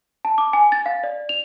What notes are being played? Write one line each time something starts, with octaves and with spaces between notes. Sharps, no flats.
A5
D6
G#5
A6
F5
D5
F7